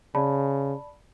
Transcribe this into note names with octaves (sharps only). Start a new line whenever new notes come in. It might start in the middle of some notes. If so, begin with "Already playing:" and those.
C#3 D5 A5 B5